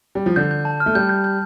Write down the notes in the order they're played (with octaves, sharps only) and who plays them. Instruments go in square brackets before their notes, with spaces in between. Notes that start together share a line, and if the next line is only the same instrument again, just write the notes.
[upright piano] G3
F3
[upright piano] D3 [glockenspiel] G6
[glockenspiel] G6
A5
F6
[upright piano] A3
[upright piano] G3 [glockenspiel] G6
[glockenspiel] G6
G6